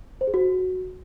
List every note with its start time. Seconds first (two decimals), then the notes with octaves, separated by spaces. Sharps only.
0.21 C5
0.27 G#4
0.34 F#4